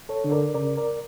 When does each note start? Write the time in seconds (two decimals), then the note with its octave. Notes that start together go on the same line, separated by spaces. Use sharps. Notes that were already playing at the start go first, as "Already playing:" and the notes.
0.09 A4 C#5
0.24 D3
0.31 A#4 D5
0.54 C#3 A#4 D5
0.77 A#4 D5